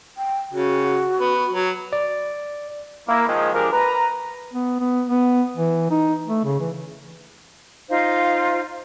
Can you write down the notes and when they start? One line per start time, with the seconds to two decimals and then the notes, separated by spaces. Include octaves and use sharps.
0.18 G5
0.52 C#3 F#4
1.20 B3
1.52 F#3
1.93 D5
3.08 A#3 E4
3.27 D#3 F3 G#3
3.54 F3 G#3 D4 G4 G#4 A#4
3.72 B4 A#5
4.53 B3
4.79 B3
5.08 B3
5.57 E3
5.91 D#4
6.27 A3
6.45 C#3
6.60 E3
7.89 D#4 F4 C5 F5